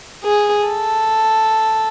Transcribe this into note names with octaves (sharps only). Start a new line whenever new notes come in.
G#4
A4